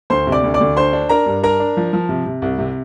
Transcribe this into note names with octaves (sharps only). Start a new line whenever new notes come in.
D2 C5 C6
C3
D5 D6
D2
D5 D6
D2
D4 C5 C6
D4
D4 A#4 A#5
G2
D4 A#4 A#5
D4
F3
F3
C3
C3
C2
C3